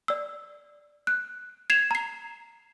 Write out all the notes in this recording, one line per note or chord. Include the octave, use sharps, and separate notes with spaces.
D5 E6
F#6
G#6 C7 E7 F7
A#5 C7